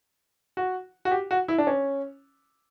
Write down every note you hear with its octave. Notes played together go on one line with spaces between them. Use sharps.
F#4
F#4
G4
F#4
E4
D4
C#4